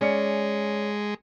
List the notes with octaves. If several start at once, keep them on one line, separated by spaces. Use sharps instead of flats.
G#3 C#4 D5 C#7